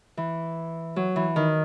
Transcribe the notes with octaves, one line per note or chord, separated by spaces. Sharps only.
E3
F#3
E3
D#3